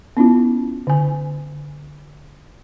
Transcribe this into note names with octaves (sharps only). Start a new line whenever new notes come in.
B3 C#4 E4 F4
D3 G#5